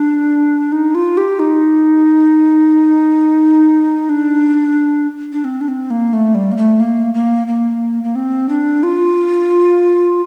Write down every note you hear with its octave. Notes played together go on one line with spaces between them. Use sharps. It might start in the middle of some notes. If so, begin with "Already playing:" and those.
Already playing: D4
D#4
F4
G4
D#4
D4
D4
C4
D4
C4
A#3
A3
G3
A#3
A3
A#3
A#3
A#3
A#3
C4
D4
F4